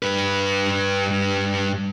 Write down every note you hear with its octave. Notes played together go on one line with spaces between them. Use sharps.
G2 B4